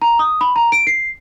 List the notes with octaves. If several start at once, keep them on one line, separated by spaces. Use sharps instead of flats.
A#5
D#6
B5
A#5
D7
C7